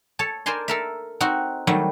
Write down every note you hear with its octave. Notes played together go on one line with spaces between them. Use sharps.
A4 C#5 A5
A#4 C5 D5 G#5 A5 C6
A4 A#4 E5
C4 D#4 F#4
D#3 F#3 G3 A3